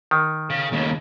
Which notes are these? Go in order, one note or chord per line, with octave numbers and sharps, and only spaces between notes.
D#3
C#3
D#2 C#3